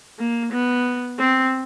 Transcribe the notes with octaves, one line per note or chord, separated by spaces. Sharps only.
A#3
B3
C4